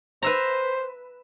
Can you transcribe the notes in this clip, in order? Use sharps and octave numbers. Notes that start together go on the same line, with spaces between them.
B4 C5 E5 A#5